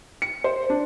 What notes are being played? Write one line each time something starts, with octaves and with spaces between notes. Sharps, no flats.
C#7
C5
D4